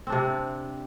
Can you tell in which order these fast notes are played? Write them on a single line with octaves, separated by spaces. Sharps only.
C4 D4 C3